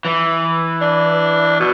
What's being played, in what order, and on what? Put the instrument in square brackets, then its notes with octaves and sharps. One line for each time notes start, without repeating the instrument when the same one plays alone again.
[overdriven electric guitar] E3
[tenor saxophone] D4
B2